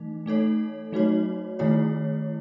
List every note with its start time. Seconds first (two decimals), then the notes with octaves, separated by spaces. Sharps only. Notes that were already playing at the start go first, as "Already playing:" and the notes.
Already playing: E3 A3 D#4
0.26 A3 D#4 A4 C#5
0.92 F#3 A3 D#4 F#4 C#5
1.59 D#3 A3 E4 G#4 C#5